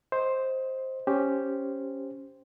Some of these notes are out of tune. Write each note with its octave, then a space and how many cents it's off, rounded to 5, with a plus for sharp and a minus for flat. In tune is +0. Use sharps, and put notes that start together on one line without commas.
C5 +5 D#5 +20
C#4 +0 G4 +0 C5 +0